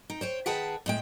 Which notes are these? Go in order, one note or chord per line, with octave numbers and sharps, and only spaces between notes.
D#4 G5
C5 C#5 G5
D#3 G#4 B4 F#5 G5 A5
A2 G#3 G5